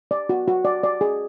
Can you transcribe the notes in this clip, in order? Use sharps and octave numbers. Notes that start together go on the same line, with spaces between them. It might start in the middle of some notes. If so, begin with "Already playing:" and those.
D5
F#4
F#4
D5
D5
G#4